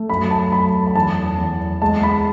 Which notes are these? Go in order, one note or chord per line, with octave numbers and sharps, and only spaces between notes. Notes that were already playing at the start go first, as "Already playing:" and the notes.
Already playing: A3
F#2 B5
A5
F#2 B5
B5
E2 A5
E2
G#3 A5
B5